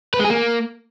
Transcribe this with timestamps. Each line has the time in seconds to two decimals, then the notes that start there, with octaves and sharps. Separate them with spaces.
0.14 B4
0.19 G#3
0.25 G#4
0.30 A#3